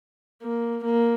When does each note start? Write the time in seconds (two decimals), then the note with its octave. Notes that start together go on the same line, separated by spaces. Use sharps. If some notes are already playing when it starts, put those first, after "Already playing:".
0.43 A#3
0.85 A#3